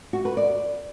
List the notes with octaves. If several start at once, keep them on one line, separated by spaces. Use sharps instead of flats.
F#4
B4
D5